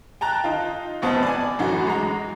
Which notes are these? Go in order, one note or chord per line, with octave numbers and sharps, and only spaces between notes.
G5 A5 A#5 F#6
D#4 F4
F1 C#2 B3 C4 A5
D5 G#5
F#2 A2 E3 F#4
G#3 A#5